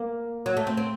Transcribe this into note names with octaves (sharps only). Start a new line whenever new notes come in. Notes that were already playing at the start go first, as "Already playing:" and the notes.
Already playing: A#3
F#3
A3
C4
C4